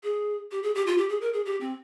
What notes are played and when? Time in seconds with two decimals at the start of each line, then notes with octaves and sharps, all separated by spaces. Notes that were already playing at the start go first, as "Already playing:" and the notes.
0.03 G#4
0.52 G4
0.63 G#4
0.75 G4
0.87 F4
0.98 G4
1.09 G#4
1.21 A#4
1.33 G#4
1.45 G4
1.61 C4